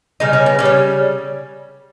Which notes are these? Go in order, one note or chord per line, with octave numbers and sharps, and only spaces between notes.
C#3 G3 D#4
C#4
B3
G3 C#4
C#3